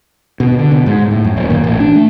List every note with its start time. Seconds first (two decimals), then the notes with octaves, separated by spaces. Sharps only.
0.40 B2
0.59 D3
0.71 B2
0.86 G#2
1.11 A2
1.24 F#2
1.37 D#1
1.50 A#2
1.64 A1
1.80 D4
1.96 A3